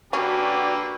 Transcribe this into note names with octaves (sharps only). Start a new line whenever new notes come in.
D3 A#3 C#4 D4 F#4 G4 B4